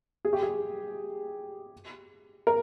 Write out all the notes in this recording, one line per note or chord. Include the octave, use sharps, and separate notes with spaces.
G#4
G4
G#4
A#4